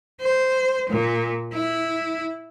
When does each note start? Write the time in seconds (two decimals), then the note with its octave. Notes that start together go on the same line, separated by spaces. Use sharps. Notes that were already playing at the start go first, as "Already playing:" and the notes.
0.20 C5
0.90 A#2
1.53 E4